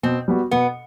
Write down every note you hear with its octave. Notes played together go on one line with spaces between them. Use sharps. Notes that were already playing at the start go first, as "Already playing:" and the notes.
B2 C4
G3 B3 F#4
B2 B3